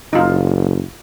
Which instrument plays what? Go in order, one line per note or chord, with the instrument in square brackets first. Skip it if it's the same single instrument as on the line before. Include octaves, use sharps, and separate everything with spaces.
[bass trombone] F#1 [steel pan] D#4 F4